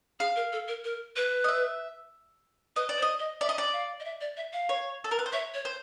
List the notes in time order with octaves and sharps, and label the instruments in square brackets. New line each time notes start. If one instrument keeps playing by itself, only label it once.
[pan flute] G#4 [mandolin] F5
[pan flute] A#4
A4
A#4
A#4
B4
[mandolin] D#5
E5
[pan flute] B4 [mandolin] D#5
[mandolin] D5
[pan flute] C5
[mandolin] D#5
[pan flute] D#5
[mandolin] D5 [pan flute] E5
[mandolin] D#5
D5
[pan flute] F5
D#5
E5
D5
E5
F5
[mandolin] C#5
A4
A#4
B4
C5
[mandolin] C#5 [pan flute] E5
[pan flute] C#5
[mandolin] C5